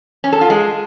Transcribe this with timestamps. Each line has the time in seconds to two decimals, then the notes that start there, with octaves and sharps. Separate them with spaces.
0.24 C#4
0.32 A4
0.41 F4
0.50 G#3